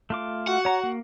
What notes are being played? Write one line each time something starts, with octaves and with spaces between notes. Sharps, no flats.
A3 F4 D6
F#4 F#5
C#5 A#5
A#3